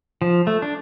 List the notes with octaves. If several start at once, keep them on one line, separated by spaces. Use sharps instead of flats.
F3
A3
D4